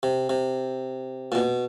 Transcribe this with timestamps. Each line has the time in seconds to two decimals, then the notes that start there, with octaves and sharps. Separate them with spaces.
0.03 C3
0.30 C3
1.32 A#2
1.35 B2